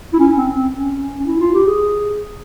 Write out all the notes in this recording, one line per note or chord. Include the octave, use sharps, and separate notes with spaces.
E4
C#4
C4
C4
C#4
C#4
E4
F4
G4
G#4